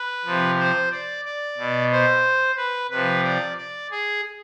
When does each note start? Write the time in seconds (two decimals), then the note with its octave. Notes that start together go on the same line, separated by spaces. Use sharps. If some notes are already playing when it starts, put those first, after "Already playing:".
Already playing: B4
0.25 C3 F3
0.58 C5
0.92 D5
1.25 D5
1.58 B2
1.91 C5
2.57 B4
2.91 C3 F3 B4
3.24 D5
3.58 D5
3.91 G#4